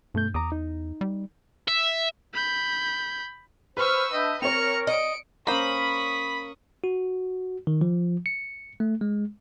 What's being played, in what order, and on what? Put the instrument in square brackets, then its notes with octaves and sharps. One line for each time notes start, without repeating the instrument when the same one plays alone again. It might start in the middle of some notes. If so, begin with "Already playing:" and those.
[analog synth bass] G2 [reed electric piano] B2 A3 G6
[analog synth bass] E2 [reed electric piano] A#5 D6 D#6
[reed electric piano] D#4
[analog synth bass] G3
[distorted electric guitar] E5
[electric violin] B5 G6
[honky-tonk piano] B4 [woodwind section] C5 F6 [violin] C#6 E6
[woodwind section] D4 E5 G5 [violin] D#5
[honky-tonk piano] C4 C#5 [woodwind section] A#4 [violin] C#7 F7
[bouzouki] D#5 [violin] C#7 D7
[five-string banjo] A#3 C5 [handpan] C#4 A#4 [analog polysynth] B5 [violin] C#6 D#6
[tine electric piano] F#4
D#3
F3
C#7
A3
G#3